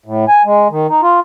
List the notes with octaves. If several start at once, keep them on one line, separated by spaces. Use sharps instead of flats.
A2
G#5
G#3
D#3
D#4
F4